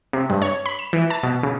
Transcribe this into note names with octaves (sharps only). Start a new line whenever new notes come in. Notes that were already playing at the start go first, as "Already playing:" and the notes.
C3
G2
C#5
B5
E7
E3
A5
B2
C#3